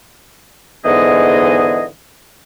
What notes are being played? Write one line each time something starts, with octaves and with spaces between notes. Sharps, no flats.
G#2 D3 E3 B3 G#4 D#5